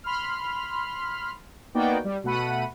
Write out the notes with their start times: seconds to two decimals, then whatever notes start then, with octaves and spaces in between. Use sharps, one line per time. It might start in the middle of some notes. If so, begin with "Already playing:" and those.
0.04 B5 C6 F6
1.74 A#3 B3 D#4 F#4 D5 G5
2.05 G3
2.24 B2 A3 F#5 B5 D#7